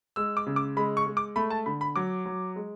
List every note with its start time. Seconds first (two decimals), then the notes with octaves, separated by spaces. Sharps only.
0.16 G#3 E6
0.37 D6
0.47 C#3
0.56 D6
0.77 G#3 B5
0.97 C#6
1.07 G#3
1.17 D6
1.36 A3 B5
1.50 A5
1.66 D3 B5
1.81 B5
1.96 F#3 D6
2.26 F#3
2.56 G#3